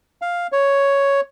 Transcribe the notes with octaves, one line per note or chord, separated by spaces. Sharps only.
F5
C#5